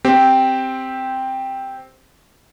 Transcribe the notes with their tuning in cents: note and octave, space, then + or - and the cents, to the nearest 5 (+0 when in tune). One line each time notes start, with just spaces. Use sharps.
C4 +0 G4 +0